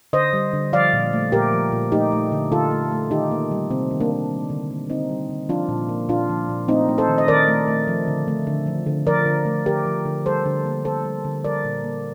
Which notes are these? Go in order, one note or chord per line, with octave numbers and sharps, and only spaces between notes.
D3 C5 D#5
G3
D3
F3 D5 F5
A#2
A3
A#2 G4 A#4
F3
A#2
A3 D#4 G4
A3
D3
D3 F4 A4
A3
A3
D#3 D#4 G4
A#3
G3
C3 C4
D#3
A#3 D4
A#3
G3
D3
A#3
D3 C4 D#4
G3
D3
F3 D4 F4
A#2
A#3
A#2 D4 F4
F3
A#2
A3 C4 D#4
A3
A4 C5
D#3
D#5
D#3 A#4 D5
A3
A3
F3
D3
A3
D3
F3
D3
F3 A#4 D5
D3
A3
D3 G4 A#4
F3
D3
G3 A4 C5
D3
A#3
D3 A4 C5
G3
D3
G3 A#4 D5
A#2
A#3